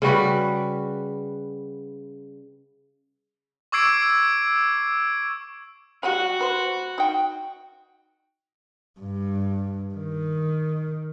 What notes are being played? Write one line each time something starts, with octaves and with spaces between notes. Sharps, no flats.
C#3 G3 F#4 B4
C#6 D6 E6 G#6 C7 D7
F#3 G3 F#4 F#5
B4 C5
D#4 G5
G2
D#3